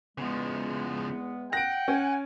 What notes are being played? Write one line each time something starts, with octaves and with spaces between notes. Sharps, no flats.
E2 C#3 F3 G#3 B3
F#5 G5 A#6 D7
C#4 G#5